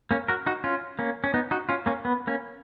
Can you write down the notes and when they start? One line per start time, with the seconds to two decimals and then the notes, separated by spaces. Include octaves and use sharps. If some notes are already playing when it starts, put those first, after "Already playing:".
0.11 A#3 C#4
0.28 F#4 A#4
0.46 D#4 F#4
0.64 C#4 F4
0.99 A#3 C#4
1.24 C#4
1.34 B3 D#4
1.51 D#4 F#4
1.69 C#4 F4
1.86 A#3 C#4
2.05 B3
2.27 A#3 C#4